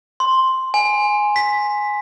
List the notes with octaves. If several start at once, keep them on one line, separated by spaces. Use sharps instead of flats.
C6
G#5
B6